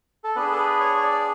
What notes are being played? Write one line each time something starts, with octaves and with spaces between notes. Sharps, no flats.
A4
B3 D4 G#4 B4
A4
B4
C#5
C#5
D5